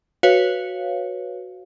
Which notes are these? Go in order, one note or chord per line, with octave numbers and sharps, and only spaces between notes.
F#4 B4 C#5 F5